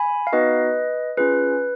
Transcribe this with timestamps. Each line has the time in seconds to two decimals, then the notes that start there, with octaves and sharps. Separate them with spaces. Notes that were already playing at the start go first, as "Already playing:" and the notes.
Already playing: G#5 B5
0.27 F5
0.32 B3 D#4 F#4 B4 D#5
1.17 C#4 F4 G#4 B4